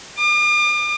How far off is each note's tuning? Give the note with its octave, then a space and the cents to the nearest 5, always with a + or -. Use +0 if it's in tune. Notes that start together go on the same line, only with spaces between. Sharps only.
D6 +45